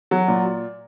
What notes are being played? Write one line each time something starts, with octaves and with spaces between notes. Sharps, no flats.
F#3
A#2